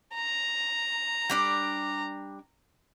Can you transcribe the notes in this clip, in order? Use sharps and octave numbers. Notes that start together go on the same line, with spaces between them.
A#5
G3 D4 D5